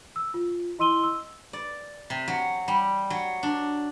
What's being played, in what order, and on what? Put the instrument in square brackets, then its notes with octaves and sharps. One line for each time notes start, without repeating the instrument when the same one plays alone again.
[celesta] E6
F4
E4 D#5 C6 E6 D#7 G7
E6
[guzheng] D5
C3
F#3
G3
F#3
D4